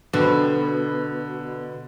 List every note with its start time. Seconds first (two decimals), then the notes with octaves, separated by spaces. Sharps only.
0.13 B2 D3